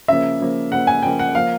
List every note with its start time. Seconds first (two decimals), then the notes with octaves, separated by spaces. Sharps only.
0.08 C#3 F3 A#3 E5
0.40 C#3 F3 A#3
0.71 C#3 F3 A#3 F#5
0.87 G#5
1.03 C#3 F3 A#3 G5
1.19 F#5
1.35 F3 A#3 F5